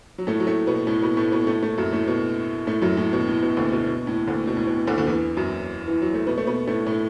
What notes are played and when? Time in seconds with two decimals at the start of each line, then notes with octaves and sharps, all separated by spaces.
0.18 F#3
0.27 A2 A3
0.40 F#3
0.47 A2 A3
0.67 B2 B3
0.87 A2 A3
1.02 B2 B3
1.17 A2 A3
1.32 B2 B3
1.47 A2 A3
1.63 A2 A3
1.77 F#2 F#3
1.93 A2 A3
2.07 B2
2.67 A2 A3
2.82 F#2 F#3
2.97 A2
3.13 B2
3.28 A2
3.42 B2
3.57 D2 D3
3.72 B2
3.87 B2
4.07 A2
4.27 D2 D3
4.47 B2
4.57 A2
4.67 B2
4.87 D2 D3
4.98 D3
5.07 E2 E3
5.37 F#2 F#3
5.88 E3
6.02 F#3
6.14 A3
6.27 B2 B3
6.38 A3
6.46 B2 B3
6.67 A2 A3
6.86 A2 A3